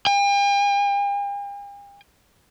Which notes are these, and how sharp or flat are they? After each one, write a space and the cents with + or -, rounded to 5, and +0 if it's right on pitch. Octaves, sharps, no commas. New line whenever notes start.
G5 +45